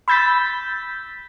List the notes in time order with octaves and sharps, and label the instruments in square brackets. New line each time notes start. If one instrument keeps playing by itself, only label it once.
[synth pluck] B5 E6 G6 A6 B6